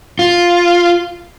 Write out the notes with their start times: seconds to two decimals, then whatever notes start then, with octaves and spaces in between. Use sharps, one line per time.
0.19 F4